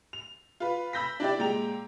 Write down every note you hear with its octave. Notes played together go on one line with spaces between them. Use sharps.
F7
F4 B4
B5 E6 G6 A#6 B6
D4 E4 G4 D5
A#2 G#3 G5 A#5 F7